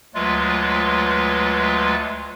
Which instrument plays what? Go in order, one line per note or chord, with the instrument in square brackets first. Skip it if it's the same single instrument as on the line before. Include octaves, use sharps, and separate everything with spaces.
[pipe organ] D2 F#3 G#3 A3 F4 B4